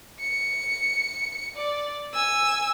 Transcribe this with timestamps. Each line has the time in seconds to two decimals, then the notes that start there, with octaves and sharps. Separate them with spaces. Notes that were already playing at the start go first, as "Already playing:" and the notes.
0.20 C#7
1.56 D5
2.14 G#5 E6